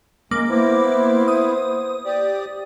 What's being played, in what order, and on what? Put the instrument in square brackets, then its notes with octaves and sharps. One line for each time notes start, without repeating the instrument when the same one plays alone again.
[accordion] C#3 G#3 [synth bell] A#3 D6
[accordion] B3 E4 [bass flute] C5
[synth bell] D#6
[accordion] G4 D5